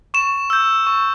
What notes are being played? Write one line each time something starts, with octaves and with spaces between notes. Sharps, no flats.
C#6 E7
E6 G6
C#6